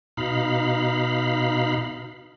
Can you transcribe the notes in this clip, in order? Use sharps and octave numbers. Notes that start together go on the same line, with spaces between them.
B2 D#4 F5 B5